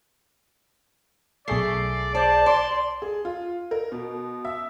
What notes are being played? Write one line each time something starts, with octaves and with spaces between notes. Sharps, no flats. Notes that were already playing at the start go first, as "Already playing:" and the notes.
B1 A3 G#4 D5 C7
C5 D5 A5
D5 C6
G#4
F4
A#4
B2
E5